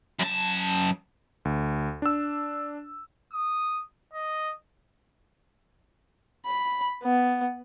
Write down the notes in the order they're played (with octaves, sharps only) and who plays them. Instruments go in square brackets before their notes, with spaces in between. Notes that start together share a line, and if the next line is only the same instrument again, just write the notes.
[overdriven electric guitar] F#2 A5
[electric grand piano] D2
D4 E6
[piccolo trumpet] D#6
D#5
[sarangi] B5
B3